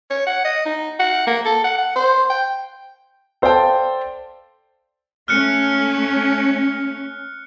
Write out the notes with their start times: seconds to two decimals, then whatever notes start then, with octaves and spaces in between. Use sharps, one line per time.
0.10 C#5
0.27 F#5
0.45 D#5
0.66 D#4
0.99 F#5
1.27 A#3
1.46 A4
1.65 F#5
1.78 F#5
1.96 C5
2.30 G5
3.42 A4 C5 D5 F5 G5 A5
5.28 A3 C#4 F6 F#6 C#7